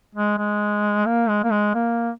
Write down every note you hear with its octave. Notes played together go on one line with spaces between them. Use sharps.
G#3
G#3
A#3
G#3
A#3
G#3
A#3